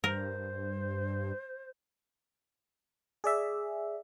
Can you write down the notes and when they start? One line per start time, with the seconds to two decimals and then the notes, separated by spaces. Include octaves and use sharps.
0.04 G2 A#4 C5
3.24 G#4 D5 E5